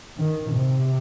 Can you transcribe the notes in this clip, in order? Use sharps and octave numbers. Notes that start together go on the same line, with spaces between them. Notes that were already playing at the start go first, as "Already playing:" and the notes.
D#3
C3